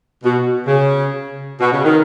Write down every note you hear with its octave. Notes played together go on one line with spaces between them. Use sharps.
B2
C#3
B2
C#3
D#3